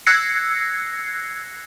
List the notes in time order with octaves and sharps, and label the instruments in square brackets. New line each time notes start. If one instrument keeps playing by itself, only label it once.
[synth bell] E6 F#6 G#6 A#6 C7 C#7